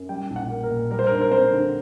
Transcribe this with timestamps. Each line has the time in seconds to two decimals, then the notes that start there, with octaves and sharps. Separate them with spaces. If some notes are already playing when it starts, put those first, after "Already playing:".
Already playing: F#2
0.09 G3 G5
0.30 A#1
0.36 F#5
0.50 A#3
0.63 A#4
0.70 A#2
0.91 G3 A#4
0.99 C5
1.07 A#4
1.11 G2 C5
1.22 A#4
1.31 C4 C5
1.52 D3